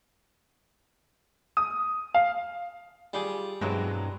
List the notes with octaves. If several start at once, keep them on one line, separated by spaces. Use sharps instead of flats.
D#6
F5
G3 F4 G4 G#4
G2 B2 E3 F#3 G#3 C4